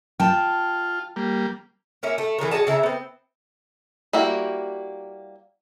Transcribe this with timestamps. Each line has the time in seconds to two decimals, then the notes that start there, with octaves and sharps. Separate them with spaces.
0.20 F4 G5 A5
1.16 G3 A#3
2.03 A#3 C#4 E4
2.18 A3
2.39 E3 F#3 G#4 A#4
2.51 F#4 G#4 D#5 A5
2.67 C#3 E4 E5 A#5
2.83 B3 C4
4.13 G3 A#3 E4 F#4